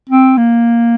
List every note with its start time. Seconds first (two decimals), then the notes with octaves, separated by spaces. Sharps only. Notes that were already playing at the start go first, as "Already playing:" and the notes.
0.10 C4
0.37 A#3